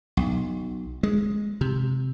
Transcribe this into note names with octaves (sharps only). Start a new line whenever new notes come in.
B1
G#3
C3